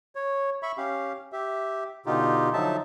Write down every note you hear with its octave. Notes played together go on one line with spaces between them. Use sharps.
C#5
E5 B5 C#6
C#4 G4 F5
G4 E5
B2 D3 D#4 F4 G4
D3 F3 F#3 D#4 E5 A5